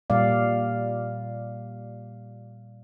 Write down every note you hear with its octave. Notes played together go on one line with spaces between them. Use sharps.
A#2 G3 D5 F5